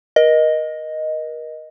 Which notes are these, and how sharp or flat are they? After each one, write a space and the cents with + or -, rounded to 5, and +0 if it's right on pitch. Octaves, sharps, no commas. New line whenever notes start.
A#4 +35 D#5 +0